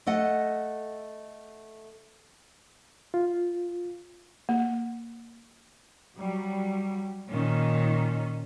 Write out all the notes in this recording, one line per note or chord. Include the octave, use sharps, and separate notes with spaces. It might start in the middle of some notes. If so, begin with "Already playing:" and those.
A3 A4 D#5 F#5
F4
A#3
F#3 G3
A#2 D#3 C#4 D#4